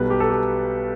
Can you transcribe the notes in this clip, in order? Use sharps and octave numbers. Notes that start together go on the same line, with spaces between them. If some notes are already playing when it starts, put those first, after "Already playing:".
Already playing: B1 B2 G3 B4
G4
A4
G4